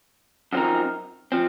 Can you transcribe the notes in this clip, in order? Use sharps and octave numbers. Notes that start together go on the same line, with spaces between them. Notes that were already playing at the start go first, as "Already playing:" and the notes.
F#2 F3 C4 D#4 A#4
F3 C4